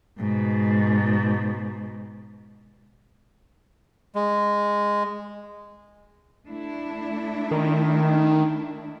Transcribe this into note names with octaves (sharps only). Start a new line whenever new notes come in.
G#2 B2
G#3
A3 D4 E4
D#3